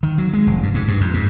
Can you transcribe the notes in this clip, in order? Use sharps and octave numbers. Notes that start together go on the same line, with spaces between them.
D#3
F#3
G#3
F1
G2
G#2
G2
F2
G#2